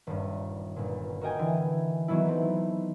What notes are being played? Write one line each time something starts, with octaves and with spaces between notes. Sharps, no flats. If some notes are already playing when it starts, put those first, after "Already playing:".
D#1 G2
G1 A#2
F#4 A#4 D#5 G5 G#5
D3 E3
D#3 E3 F#3 B3 E4
A3 C4